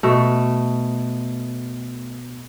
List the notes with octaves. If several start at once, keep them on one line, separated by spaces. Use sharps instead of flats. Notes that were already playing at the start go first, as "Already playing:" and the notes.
B2 A3